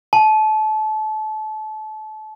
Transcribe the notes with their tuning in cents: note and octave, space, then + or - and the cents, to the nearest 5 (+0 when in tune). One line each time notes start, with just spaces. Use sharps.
A5 -30